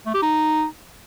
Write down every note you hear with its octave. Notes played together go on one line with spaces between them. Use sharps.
A3
G4
D#4